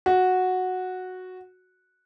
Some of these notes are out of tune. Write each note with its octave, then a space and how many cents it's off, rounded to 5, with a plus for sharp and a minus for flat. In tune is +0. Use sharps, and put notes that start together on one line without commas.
F#4 -5